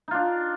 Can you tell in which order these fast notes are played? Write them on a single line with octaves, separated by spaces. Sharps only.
D#4 F4 D4